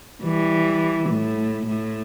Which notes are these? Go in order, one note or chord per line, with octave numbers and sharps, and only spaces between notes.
E3 G3
A2
A2